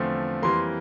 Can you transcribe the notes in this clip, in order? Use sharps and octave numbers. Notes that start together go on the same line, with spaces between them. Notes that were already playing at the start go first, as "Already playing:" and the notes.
Already playing: E2 D3 F3 A3 C4
F2 E3 G3 A#3 C6